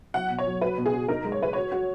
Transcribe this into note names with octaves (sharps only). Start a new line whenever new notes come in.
F#3 F#5
B2
C#5
F#3
F#4 B4
B2
G#4
F#4
D#4 A#4
G#3
C#5
G#3 B4
F#4 C#5
F#4